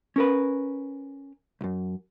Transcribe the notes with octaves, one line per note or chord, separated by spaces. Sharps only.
C#4 A#4 B4
B1 F#2